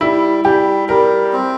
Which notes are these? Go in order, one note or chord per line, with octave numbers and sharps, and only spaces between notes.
G3 E4
G3 G4
G3 A#4
C4